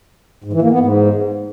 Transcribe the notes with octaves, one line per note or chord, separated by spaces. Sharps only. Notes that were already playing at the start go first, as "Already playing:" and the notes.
G#2
E3
A#3
B3
G#2